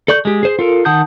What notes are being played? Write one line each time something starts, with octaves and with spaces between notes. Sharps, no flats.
A4 D5 C#6 G6
G#3 G4
G#4 C5
F4 A4 A#4
D#3 F#5 A5 D#6 G6